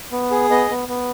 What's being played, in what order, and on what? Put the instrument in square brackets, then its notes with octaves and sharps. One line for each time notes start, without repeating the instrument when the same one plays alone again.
[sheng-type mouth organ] B3
G#4
B3 D#5
B3
B3